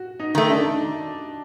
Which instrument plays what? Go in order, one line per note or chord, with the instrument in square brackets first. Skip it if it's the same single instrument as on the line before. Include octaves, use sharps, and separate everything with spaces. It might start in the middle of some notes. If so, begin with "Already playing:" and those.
Already playing: [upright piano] F#4
D#4
[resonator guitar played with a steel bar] D#3 A3
[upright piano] D4